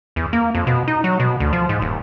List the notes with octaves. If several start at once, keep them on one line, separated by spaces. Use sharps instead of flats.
E2
A#3
F2
B2
D#4
F#3
B2
D2
F3
G#2
D#1